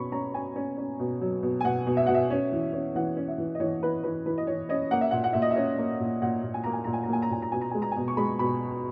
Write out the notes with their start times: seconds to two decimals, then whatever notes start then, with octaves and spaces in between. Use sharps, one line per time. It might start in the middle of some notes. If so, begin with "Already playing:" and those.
Already playing: B2 C#4 B5 C#6
0.12 C#4 A#5
0.34 C#4 G#5
0.56 C#4
0.77 C#4
0.99 B2
1.21 F#3
1.43 B2
1.61 G#5
1.65 B2 F#5
1.87 B2
1.97 E5
2.06 B2 F#5
2.14 E5
2.30 C#4
2.52 E3
2.73 C#4
2.95 E3 F#5
3.17 C#4
3.28 E5
3.38 E3
3.55 D#5
3.60 E3 C#5
3.82 E3 B4
4.03 E3 B4
4.26 E3 B4
4.38 D#5
4.47 E3 C#5
4.69 C#4 D#5
4.91 A#3 F#5
5.01 E5
5.11 A#2 F#5
5.24 F#5
5.33 A#2 E5
5.42 D#5
5.51 E5
5.56 C#4
5.78 A#3
6.00 A#2
6.22 A#2 F#5
6.43 A#2
6.54 G#5
6.64 A#3 A#5
6.73 G#5
6.84 A#2 A#5
6.93 G#5
7.03 A#5
7.08 A#3 G#5
7.22 A#5
7.30 A#2 G#5
7.42 A#5
7.52 B2 G#5
7.61 A#5
7.71 G#3 G#5
7.82 A#5
7.92 B2 G#5
8.08 C#6
8.17 G#3 B5
8.39 B2 B5